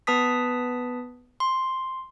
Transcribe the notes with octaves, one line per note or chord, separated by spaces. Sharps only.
B3 B4 A5 D#6 B6
C6